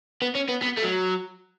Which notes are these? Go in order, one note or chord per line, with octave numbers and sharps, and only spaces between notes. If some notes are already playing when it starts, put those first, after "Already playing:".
B3
C#4
B3
B3
A3
F#3